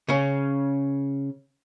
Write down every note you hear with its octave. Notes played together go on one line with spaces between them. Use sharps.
C#3 C#4